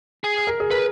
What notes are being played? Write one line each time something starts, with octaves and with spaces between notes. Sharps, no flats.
G#4
A#4
G#4
A#4 B4